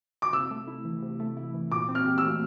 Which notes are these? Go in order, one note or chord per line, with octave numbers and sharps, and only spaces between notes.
D6
C3 E6
A3
E4
E3
C3
A3
E4
E3
A#2 D6
C4
F6
G4
E6
A3